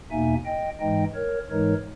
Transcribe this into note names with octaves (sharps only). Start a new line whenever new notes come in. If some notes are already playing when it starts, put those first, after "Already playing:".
E2 B2 A#3 D#4 E5 G#5
D#5 G5
G#2 E3 G#3 D#4 D#5 G5
A#4 C#5
G#2 E3 G#3 D#4 A#4 C#5